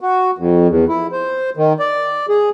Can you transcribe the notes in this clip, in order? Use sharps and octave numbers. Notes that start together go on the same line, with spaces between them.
F#4
F2
E2
E4
C5
D#3
D5
G#4